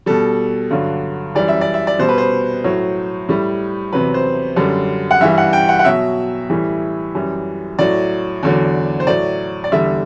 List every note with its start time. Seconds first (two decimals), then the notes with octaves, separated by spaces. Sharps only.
0.06 B2 G3 A4
0.71 G2 D3 F#3
1.35 F#2 E3 G3 D5
1.48 E5
1.61 D5
1.74 E5
1.87 D5
1.99 B2 G3 C5
2.09 B4
2.18 C5
2.64 A2 F#3
3.29 A2 G3
3.93 E2 C3 F#3 B4
4.14 C5
4.56 F#2 D3 G3
5.11 F#5
5.21 G2 E3 G3 E5
5.38 F#5
5.53 G5
5.69 F#5
5.79 F#5
5.85 B2 F#3 E5
6.50 A2 E3 G3
7.15 F#2 E3 G3
7.79 A2 F#3 D5
8.43 E2 D3 F#3
9.00 C5
9.07 A2 F#3 D5
9.64 D5
9.72 E2 D3 G3 E5